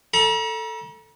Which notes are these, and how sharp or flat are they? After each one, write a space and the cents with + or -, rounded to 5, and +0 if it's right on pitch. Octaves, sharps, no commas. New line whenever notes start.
A4 +10 A#5 +40